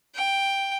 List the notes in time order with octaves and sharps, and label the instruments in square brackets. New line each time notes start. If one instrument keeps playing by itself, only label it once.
[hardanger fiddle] G5